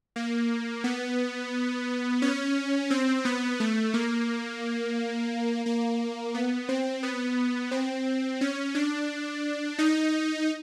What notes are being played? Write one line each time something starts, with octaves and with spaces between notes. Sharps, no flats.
A#3
B3
C#4
C4
B3
A3
A#3
A#3
B3
C4
B3
C4
C#4
D4
D#4